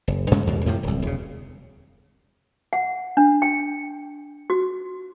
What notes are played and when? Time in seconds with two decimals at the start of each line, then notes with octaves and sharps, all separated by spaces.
0.08 F#1
0.31 G2 C#3 G#3 A3
0.47 D#2 G#2 B2
0.66 F2 A2 C3 F3
0.83 D1 C2
1.02 E1 C#3
2.73 F#5
3.17 D4
3.42 G5
4.50 F#4